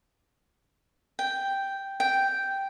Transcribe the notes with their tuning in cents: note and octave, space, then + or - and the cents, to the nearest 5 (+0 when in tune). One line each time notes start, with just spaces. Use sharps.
G5 +0
G5 -5